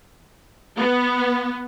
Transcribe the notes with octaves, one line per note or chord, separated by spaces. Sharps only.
B3